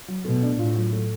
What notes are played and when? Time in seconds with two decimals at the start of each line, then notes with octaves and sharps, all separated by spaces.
0.08 F#3
0.25 B2 A3
0.42 D4
0.59 A2 F4
0.76 F#3
0.93 A3